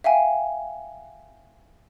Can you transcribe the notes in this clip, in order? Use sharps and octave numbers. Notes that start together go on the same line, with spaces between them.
E5 F5 G5 G#5